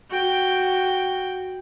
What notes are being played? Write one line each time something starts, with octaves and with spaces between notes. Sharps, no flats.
F#4 G5